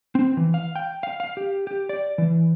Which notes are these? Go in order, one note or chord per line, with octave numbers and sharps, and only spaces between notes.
C4
E3
F5
G5
F5
F5
G4
G4
D5
E3